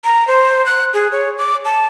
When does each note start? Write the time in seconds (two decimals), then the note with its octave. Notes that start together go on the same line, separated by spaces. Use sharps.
0.04 A#5
0.28 C5
0.66 F#6
0.94 G#4
1.12 C#5
1.38 D6
1.65 A5